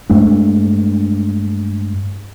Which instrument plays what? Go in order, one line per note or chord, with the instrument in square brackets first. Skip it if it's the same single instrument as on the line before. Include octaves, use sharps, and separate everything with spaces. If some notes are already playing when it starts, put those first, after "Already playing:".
[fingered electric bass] G2 G#3 A3 D4